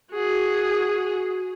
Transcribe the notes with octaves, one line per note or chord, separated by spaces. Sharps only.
F#4 G#4